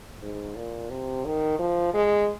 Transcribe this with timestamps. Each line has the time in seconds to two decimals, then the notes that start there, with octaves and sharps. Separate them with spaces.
0.22 G#2
0.56 A#2
0.90 C3
1.25 D#3
1.59 F3
1.94 G#3